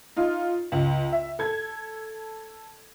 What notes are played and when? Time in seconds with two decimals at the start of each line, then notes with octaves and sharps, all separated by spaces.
0.16 D#4 F4
0.72 C#2
1.12 E5
1.39 A4 G#6